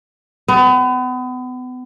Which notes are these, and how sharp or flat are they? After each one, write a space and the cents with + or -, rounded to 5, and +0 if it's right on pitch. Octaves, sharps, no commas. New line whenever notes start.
B3 +35